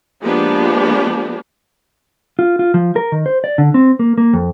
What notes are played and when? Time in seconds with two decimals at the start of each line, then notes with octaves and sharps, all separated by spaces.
0.22 F3 G#3 A#3 B3 D4 G4
2.39 F4
2.59 F4
2.74 F3
2.96 A#4
3.12 D#3
3.26 C5
3.44 D5
3.58 D3
3.74 C4
3.99 A#3
4.18 A#3
4.34 F2